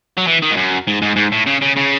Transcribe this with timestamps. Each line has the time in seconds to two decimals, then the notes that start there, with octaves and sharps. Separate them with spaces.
0.18 F#3
0.27 E3
0.42 D#3
0.51 G#2
0.57 F#2
0.87 G#2
1.02 G#2
1.16 G#2
1.32 A2
1.46 C#3
1.61 C#3
1.76 C#3